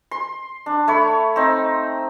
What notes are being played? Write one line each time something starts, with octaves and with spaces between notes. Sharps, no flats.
C6
D4
A3 C#5 B5
C4 D#4